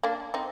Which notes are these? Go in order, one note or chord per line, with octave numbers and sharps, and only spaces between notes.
A#3 D4
C4 D#4